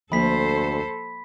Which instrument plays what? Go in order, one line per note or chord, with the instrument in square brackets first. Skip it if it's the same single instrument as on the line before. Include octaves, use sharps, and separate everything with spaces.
[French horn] D2 [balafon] F3 A#3 [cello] A4 C5 [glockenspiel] B5 B6